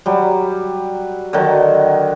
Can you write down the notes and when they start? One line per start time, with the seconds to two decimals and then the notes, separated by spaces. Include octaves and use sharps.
0.06 F#3 G3
1.33 D3 D#3 F#3